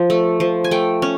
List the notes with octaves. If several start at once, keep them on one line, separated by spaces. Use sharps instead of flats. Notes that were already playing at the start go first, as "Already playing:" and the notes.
Already playing: F3
A3
F3
G#5
A3 G5
C#4